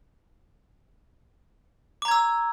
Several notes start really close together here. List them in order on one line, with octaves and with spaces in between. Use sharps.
D6 A#5 G#6 E6